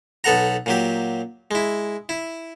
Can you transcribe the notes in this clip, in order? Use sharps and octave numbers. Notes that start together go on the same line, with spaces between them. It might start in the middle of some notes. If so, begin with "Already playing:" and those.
B1 B3 A4 F#5 A#5
A#2 F#3 G4
G#3 E4
E4